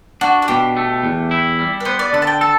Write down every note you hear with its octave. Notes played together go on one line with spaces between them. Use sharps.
D4 F#4
F#4
B2 G4
A3
E2
E4
G3
B4
B3 C5
D5
D3 F#5
A5
G5
A4 A5